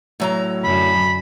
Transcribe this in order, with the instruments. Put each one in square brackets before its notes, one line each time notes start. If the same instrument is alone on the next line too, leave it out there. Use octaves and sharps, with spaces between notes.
[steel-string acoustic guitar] A2 F#3 A#5
[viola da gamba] F#2 D3 [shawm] B5